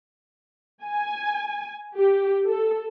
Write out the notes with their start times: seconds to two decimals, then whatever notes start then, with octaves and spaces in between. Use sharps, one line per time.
0.84 G#5
1.96 G4
2.46 A4